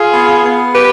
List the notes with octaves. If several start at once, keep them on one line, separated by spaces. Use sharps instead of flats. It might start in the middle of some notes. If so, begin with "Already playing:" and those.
Already playing: F4 G#4
B3
B3
G4 B4